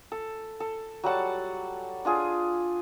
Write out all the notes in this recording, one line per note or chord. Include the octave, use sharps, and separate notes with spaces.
A4
A4
F#3 G3 F#5 A5
D4 F4 G#4